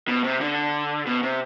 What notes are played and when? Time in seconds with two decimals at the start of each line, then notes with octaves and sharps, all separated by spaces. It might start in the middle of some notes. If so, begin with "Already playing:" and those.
0.08 B2
0.24 C3
0.41 D3
1.06 B2
1.23 C3